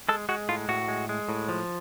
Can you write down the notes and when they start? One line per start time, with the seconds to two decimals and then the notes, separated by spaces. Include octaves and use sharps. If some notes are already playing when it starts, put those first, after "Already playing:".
0.09 G#3 A4
0.29 G#3 F#4
0.49 A2 F4
0.69 A2 F#4
0.88 G#3
1.09 G#3
1.29 A2
1.49 F3